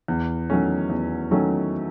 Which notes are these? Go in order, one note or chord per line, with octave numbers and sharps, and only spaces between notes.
E2
D#3 F#3 A3 C#4
E2
D#3 F#3 A3 C#4